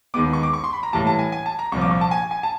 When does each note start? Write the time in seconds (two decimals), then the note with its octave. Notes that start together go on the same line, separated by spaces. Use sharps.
0.14 D#2 D#3 G#3 B3 D6
0.33 C#6
0.43 D6
0.53 C#6
0.64 C6
0.73 B5
0.83 A#5
0.93 A2 E3 G3 A#3 A5
1.07 A5
1.19 G#5
1.32 G#5
1.46 A5
1.59 A#5
1.72 C2 A#2 F3 C#6
1.81 D6
1.91 C#6
2.01 A5
2.11 G#5
2.31 G#5
2.43 A5